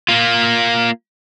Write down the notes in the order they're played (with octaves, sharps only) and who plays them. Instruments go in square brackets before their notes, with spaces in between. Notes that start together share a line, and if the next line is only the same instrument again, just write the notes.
[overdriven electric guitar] A#3 F4